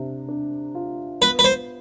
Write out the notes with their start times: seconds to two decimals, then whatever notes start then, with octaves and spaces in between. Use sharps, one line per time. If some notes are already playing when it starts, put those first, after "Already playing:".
Already playing: C3 D4
0.28 D4
0.75 F4
1.21 B3 B4
1.39 B4
1.44 C5